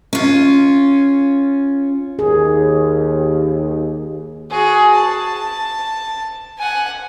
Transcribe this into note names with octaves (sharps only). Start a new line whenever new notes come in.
C#4 F4
D#2 G#4
F#4 G#4
A5
F#5 G#5